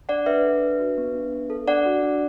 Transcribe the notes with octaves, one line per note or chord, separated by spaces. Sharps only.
D4 D5 F#5
D4 B4 E5
A4
D4
F#4
B3
D4
B3
A4
D4 D5 F#5
F#4
D4